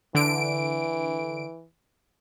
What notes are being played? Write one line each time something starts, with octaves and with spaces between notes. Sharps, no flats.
D3 E3 D7